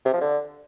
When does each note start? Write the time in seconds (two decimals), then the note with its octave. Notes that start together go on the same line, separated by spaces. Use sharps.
0.05 C3
0.13 F3
0.21 D3